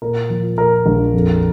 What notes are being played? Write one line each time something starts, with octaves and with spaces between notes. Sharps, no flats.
A#2 A#4
F3
A#2 A#4
A#1
F2